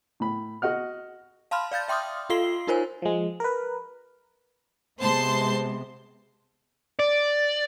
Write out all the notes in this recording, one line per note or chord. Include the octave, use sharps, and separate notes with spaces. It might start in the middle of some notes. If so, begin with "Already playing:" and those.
A2 B5
F#4 D#5 F#5 F6
F5 A5 B5 C6 F6
D5 F5 G6 A6
E5 G5 C6 D6 D#6 F6
F4 A4 F5 C6 C7 G7
D#4 F4 A#4 C5 C#5 G#5
F3 G#3
A#4 B4
C3 G#3 B3 C5 A5 C6
D5